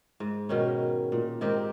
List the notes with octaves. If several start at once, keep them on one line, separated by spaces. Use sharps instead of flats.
G#2
B2 D#3 C#4
A#2
G#2 D#3 C4 G4